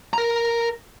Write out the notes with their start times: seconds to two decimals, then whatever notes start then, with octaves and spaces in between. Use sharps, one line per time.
0.14 A#4 A#5